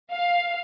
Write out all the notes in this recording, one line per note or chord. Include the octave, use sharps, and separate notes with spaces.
F5